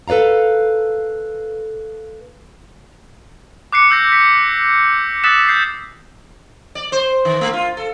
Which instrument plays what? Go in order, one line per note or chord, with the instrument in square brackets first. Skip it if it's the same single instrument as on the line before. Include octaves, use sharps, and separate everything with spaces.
[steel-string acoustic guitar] A4 B4 D5 F5 A#5
[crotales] D6 F#6 C7 C#7
E6 G6 A#6
B6
D#6 E6 F#6 A6 B6 E7
G6 C7
[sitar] D5
C5
D#3
A3
F4
A4